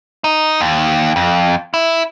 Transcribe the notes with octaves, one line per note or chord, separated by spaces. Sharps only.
D#4
D#2
F2
E4